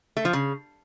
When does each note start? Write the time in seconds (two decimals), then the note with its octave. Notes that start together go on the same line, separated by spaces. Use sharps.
0.17 A3
0.25 F3
0.33 C#3